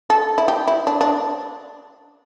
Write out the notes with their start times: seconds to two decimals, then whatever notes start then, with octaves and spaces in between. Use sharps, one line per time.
0.10 A4
0.38 E4
0.48 G4
0.68 E4
0.87 D4
1.01 D4